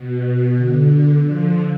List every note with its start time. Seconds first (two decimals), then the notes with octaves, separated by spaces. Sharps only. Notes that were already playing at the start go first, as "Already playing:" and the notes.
Already playing: B2
0.54 D3
1.22 D3 F3